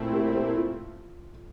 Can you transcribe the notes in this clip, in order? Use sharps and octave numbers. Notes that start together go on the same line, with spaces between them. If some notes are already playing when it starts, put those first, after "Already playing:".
Already playing: A#2 A3 C4 E4
G4 A#4
C5
G4 A#4
F4 A4